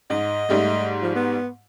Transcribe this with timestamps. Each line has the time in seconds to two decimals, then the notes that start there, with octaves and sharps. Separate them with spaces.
0.10 G#2 D#5
0.49 G#2 G3 A3
1.01 F3
1.15 B3